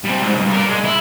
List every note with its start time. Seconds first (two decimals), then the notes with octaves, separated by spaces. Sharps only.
0.05 G3 C4
0.22 G#2
0.35 C2 G2
0.52 A#4 D5
0.69 G#3
0.85 E4